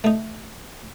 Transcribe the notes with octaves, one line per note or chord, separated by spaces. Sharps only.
A3 D#4